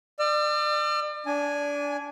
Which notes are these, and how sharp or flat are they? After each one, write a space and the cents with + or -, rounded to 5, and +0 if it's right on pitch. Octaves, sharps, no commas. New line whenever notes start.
D5 +35 E6 +45
D4 -20 G#5 +0